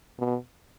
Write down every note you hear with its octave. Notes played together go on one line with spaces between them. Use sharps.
B2